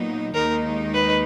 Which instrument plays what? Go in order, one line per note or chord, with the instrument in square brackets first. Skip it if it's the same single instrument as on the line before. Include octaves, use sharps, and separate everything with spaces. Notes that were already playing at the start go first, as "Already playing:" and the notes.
Already playing: [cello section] A#2 F#3 B3 D#4
[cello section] D#2 D#3 G#3 D#4 [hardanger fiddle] A#4
[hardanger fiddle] B4